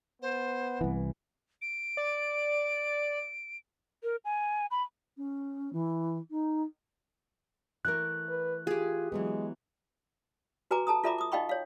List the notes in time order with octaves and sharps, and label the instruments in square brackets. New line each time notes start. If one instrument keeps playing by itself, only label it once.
[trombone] B3 [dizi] C5
[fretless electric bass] C2 E3
[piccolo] D7
[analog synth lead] D5
[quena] A#4
G#5
B5
[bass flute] C#4
E3
D#4
[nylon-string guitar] E3 A3 A#4 [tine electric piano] F#6
[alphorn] B4
[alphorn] F4 [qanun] G4 G#4
[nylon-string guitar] E3 F#3 B3 [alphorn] G#3
[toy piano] F#4 B4 G#5 A#5 D6
A4 A5 A#5 D#6
F4 A4 E5 A#5 B5 D6
D6 D#6
D#4 D#5 F5 G5 B5 C#6
C#5 F5